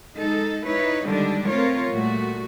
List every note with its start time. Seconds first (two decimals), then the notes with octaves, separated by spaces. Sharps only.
0.16 G#3 D#4 A4
0.66 D#4 E4 B4 C#5
1.06 D3 D#3 G3 G#3 D4
1.48 A3 C4 F4 A#4 C#5
1.92 A#2 G3 A3 F#4